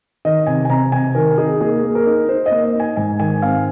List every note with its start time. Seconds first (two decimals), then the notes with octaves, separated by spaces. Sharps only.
0.25 D#3 D#5
0.47 C3 G#5
0.65 G#5
0.70 C3 A#5
0.92 C3 G#5
1.15 D#3 A#4
1.38 D#4 G#4
1.61 A#3 G#4
1.84 A#3
1.95 A#4
2.07 D#4
2.29 D#4 C5
2.46 D#5
2.51 A#3
2.74 D#4
2.80 G#5
2.97 G#2 G#5
3.20 D#3 G#5
3.42 C4 F5